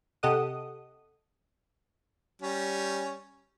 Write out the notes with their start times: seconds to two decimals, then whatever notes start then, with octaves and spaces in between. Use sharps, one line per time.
0.23 C3 G4 A4 D#5 F#5 D#6
2.42 G3 C#4